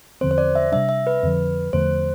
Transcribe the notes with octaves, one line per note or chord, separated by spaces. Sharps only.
E2 D3 F3 C4 C5
C5
D5
E5
C3 G3 D4 E5
E5
B4
F2 D3 F3
E2 D3 F3 A3 C5